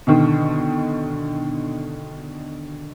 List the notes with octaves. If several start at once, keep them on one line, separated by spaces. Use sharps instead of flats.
B2 D3 D#3